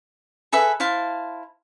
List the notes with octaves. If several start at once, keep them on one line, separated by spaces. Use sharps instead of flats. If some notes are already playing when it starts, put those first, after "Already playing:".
G#4 A4 B4 E5
E4 C5 F5 A5